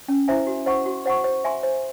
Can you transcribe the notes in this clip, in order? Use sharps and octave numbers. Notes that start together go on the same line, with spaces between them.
C#4
E4 C5 E5 G#5
F#4
C5 F#5 C#6
F#4
C5 F#5 C#6
C5
E5 G#5 C6
C5